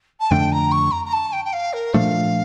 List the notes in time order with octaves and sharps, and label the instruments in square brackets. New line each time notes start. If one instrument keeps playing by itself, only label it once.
[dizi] A5
[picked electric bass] F2 D3 A3 D4 [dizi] G5
[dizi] A#5
C#6
A#5
A#5
A5
G5
G5
F5
A#4
[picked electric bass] A#2 F3 A3 D4 [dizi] F5